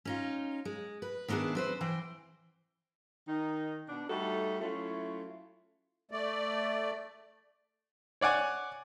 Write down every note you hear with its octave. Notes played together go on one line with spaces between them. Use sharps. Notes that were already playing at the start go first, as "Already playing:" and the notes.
C#4 D#4 F4
G#3
B4
D#3 B3 D4 E4 G#4
C4 B4 C5
E3 C5 G5
D#3 D#4
B2 D4
G3 A3 D#4 F#4 A4
F#3 A3 C#4 E4 F4
A3 D5
C#5 D5 F#5 G#5